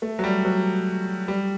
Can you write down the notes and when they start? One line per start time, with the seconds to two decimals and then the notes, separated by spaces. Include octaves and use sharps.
0.02 A3
0.19 F#3
0.24 G3
0.45 F#3
1.28 G3